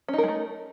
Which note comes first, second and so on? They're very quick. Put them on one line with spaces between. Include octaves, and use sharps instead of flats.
C#4 D#4 A#4 G#3 A3